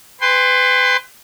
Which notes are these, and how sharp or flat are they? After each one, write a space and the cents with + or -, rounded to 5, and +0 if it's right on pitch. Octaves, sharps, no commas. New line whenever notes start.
B4 +30 G5 +35 C6 +0